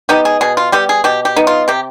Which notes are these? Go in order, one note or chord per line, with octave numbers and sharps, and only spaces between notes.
B3 D#4 G4
G#4
B2 G#4
F4
G3 B3 G4
G#4
B2 G4
G4
B3 D#4
F4
C3 G4